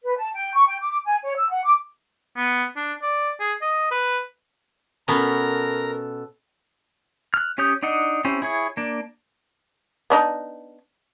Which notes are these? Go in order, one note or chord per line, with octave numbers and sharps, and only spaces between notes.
B4
A5
G5
C#6
G5
D6
G#5
C#5
E6
F#5
D6
B3
D4
D5
G#4
D#5
B4
B2 B3 C#4 A4 A#4 A#5
F6 F#6
C#4 G4 C#5 D#6 G6
D4 D#4 D#5 F#5
C4 C#4 E4 G4
E4 G#4 C#5
A#3 D4
B3 D4 D#4